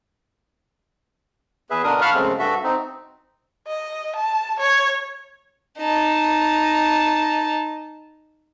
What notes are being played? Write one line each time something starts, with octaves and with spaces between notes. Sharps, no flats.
E2 G#4 B4 E5
B2 D3 D4 A#4 D#6
F5 A5 B5 C#6 F6 F#6
F#2 C#3 G#3 A3 C4
G2 F#4 A4 E5
C4 D#4
D#5
A5
C#5
D#4 A5